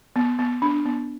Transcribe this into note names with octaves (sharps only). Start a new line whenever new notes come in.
B3
B3
D4
B3